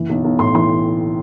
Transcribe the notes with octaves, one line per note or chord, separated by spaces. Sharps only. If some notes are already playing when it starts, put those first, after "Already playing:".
Already playing: F#1 E3
B1
B1
A2 C6
E3 C6